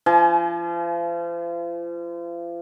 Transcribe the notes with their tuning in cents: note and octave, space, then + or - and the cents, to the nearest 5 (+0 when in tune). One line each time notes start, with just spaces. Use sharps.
F3 -35 G#5 +35